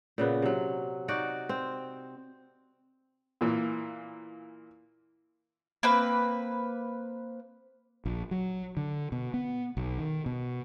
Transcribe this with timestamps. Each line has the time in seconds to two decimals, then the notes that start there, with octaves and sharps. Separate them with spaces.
0.18 A#2 C#3 B3
0.42 C3 F#3
1.08 D#4 F#4 D5
1.49 C4
3.41 A#2 E3 A#3
5.83 A#3 C4 B4
8.05 A#1
8.31 F#3
8.77 D3
9.12 B2
9.34 B3
9.77 B1
9.98 D#3
10.26 B2